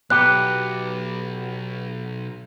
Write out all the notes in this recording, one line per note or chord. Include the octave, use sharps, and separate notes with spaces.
B1 B3 G4 F#6